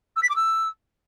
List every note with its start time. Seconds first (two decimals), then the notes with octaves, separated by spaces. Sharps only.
0.16 E6
0.22 B6
0.29 D6
0.36 E6